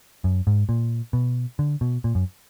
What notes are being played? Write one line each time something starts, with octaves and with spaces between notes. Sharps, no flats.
F#2
G#2
A#2
B2
D3
B2
A#2
F#2